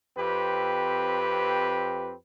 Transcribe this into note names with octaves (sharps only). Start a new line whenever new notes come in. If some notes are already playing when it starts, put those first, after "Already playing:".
F2 C4 G4 B4